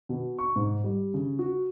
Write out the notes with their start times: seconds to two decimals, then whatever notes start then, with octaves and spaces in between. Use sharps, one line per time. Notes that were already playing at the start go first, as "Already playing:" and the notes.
0.09 B2
0.38 C#6
0.56 G#2
0.84 G3
1.14 C#3
1.39 F#4